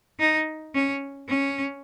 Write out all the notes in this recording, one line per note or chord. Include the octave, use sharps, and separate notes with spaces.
D#4
C#4
C#4